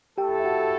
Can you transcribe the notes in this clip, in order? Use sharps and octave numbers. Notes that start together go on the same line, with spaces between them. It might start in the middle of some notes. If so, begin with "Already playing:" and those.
A3 E4 G4 A4 G5
E5
F#4 F#5